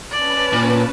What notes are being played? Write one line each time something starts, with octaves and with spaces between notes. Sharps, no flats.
C#4 B4 D5 A5
A#2